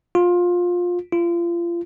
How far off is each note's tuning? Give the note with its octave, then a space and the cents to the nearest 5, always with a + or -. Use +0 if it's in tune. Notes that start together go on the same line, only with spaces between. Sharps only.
F4 +20
F4 -30